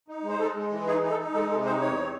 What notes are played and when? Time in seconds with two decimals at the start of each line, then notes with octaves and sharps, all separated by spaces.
0.08 D#4
0.23 G#3
0.30 C5
0.39 G#3 A4
0.55 G#3
0.71 E3
0.87 D#4 G#4
1.02 D#4
1.10 A4
1.19 D#4
1.34 G#3 A4
1.50 C3 A4
1.65 D#4 C5
1.81 E2 C#5
1.97 C4